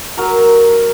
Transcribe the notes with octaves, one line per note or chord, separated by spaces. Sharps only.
F#3 A#4